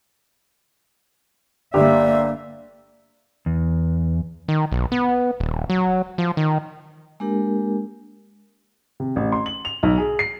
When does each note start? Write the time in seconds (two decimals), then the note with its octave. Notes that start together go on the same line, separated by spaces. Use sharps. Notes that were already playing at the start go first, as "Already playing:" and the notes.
1.74 G1 A#3 G4 D5 E5
3.46 E2
4.48 D#3
4.72 B1
4.92 B3
5.40 D#1
5.70 F#3
6.18 F3
6.37 D#3
7.20 G#3 A#3 D4 G4 A#4
9.00 C3
9.16 A1
9.32 C6
9.46 F#7
9.65 F7
9.83 B1
9.98 G#4
10.19 C7